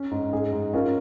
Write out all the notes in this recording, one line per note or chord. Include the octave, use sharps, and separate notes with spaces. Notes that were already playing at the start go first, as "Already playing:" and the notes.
Already playing: C#4
G#2
G#2 G#4
G#2
C#4 F4 A#4